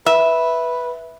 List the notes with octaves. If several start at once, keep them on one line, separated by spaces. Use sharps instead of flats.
B4 E5